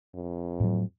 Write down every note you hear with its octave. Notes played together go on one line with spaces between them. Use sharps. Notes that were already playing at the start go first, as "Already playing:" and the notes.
F2
A2 F#3